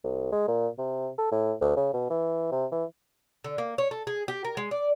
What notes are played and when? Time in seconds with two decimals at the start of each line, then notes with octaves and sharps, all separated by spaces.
0.04 C2
0.32 G#3
0.48 A#2
0.78 C3
1.18 A4
1.32 A2
1.61 D2
1.77 C#3
1.93 B2
2.10 E3
2.52 C3
2.72 E3
3.44 D3
3.58 A#3
3.78 C#5
3.91 A4
4.07 G#4
4.28 G4
4.45 A#4
4.57 G#3
4.71 D5